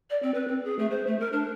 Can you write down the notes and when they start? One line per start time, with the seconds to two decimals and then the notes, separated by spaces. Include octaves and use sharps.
0.10 D5
0.23 C4
0.34 B4
0.48 C4
0.65 G#4
0.79 A3
0.91 C5
1.07 A3
1.20 A#4
1.33 D4